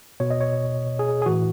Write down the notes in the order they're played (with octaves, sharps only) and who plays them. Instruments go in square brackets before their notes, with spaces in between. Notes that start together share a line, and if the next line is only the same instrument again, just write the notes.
[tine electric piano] B2 C#5
D#5
C#5
G#4
G#4
A2 E3 F#4